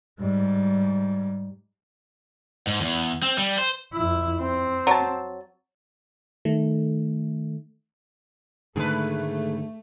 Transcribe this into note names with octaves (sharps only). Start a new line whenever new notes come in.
G#2 G3
G#2
E2
C4
G3
C5
F2 E4
C4
F#3 A5
D#3 A3
G#2 D3 D#3 A3 G#4 A4 B4